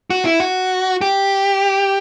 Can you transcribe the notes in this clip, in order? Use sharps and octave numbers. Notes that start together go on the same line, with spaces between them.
F#4
E4
F#4
G4